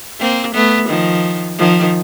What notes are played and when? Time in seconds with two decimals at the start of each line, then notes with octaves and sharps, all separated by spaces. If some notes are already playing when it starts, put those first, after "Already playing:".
0.20 A#3 C4
0.54 A3 B3
0.89 D#3 F3
1.58 D#3 F3